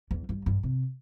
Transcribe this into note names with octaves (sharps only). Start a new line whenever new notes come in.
E2
G2
G2
C3